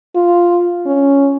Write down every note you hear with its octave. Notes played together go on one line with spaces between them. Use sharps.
F4
C#4